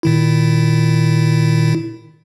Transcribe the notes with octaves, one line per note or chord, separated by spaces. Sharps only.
A#2 D#3 E4